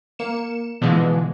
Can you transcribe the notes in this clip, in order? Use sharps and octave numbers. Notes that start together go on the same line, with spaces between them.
A#3 C#7 E7
B2 D3 E3 F3 G#3